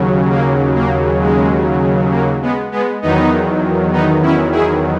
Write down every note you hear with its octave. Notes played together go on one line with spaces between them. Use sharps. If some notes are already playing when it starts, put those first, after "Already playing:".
Already playing: D#2 C#3 F#3
A#3
A#3
G#3
A#3
G#3 B3
G#3 B3
E2 D#3 F#3 B3 D#4
B3 D#4
C#4 E4
E4 G#4